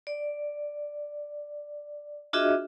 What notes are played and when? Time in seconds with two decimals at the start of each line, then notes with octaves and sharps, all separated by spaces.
0.07 D5
2.33 D4 F4 F#4 G#4 D#5 E5